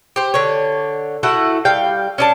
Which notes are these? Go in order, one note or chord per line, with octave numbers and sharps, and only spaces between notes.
G4 C5
D3 C#5
A3 E4 F#4 F#5
G3 F5 G5
C#4 D4 A5